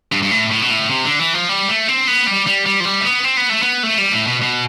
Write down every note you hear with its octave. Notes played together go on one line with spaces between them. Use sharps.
G2
G2
A2
A2
B2
A2
C3
D3
E3
F3
G3
A3
C4
B3
G3
G3
G3
F3
G3
A3
B3
C4
B3
A3
B3
A3
G3
A2
B2
B2